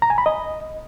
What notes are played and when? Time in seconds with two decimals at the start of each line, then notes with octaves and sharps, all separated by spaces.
0.02 A#5
0.10 G#5
0.18 B5
0.26 D#5